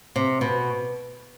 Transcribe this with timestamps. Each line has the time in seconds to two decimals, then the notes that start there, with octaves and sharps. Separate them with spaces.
0.16 C3
0.41 B2